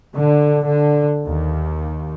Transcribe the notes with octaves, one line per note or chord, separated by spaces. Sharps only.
D3
D3
D#2